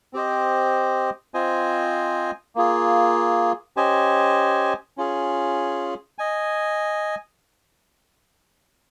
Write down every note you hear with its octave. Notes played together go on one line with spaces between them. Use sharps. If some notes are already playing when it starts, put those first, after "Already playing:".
C4 G4 C5 D#5
C4 F4 C5 D#5 G#5
A#3 F4 G#4
C#4 G4 C5 D#5 G#5
C#4 F4 G#4
D#5 G#5